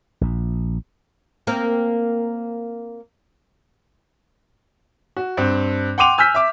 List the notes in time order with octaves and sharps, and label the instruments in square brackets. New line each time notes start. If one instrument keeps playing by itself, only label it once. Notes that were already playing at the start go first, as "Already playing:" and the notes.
[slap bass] A#1
[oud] A#3 C4 A#4
[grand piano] F#4
G2 C4
F#5 G5 C6 D6 D#7 F7
G#5 E6 F6 G6 B6
E5 D6